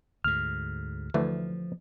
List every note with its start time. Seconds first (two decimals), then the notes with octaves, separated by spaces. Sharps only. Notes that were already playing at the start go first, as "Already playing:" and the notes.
0.24 D2 G#2 F6
1.14 D2 E3 F3 A3